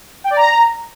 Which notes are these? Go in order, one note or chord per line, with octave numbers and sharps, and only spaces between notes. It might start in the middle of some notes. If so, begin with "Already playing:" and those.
G5
D5
A#5